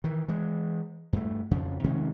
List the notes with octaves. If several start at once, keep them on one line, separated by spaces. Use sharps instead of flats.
D#3 E3
E3 G#3
G2 A3
F2 C#3 F3
C3 D#3 G#3 C#4